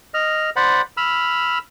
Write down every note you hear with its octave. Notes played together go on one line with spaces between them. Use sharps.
D#5 F6
C5 D5 F#5 B5
B5 E6 F6